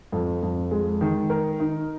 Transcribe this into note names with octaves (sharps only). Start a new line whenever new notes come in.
F2
F2
G#3
D#3
A#4
D#4